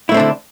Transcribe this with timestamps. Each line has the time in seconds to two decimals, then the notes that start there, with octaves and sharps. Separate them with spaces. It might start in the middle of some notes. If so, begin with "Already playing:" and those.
0.09 E4
0.12 A3
0.14 C4
0.17 D4
0.20 D3